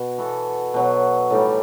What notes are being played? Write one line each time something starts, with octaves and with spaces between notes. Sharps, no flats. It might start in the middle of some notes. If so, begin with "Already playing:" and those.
Already playing: B2
E3 B3 F#4 A4
B2 F#3 B3
A2 E3 G3 D#4